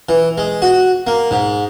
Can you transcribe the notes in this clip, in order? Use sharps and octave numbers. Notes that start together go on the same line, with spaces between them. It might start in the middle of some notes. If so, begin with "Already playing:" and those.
E3
G#3
F#4
A#3
G#2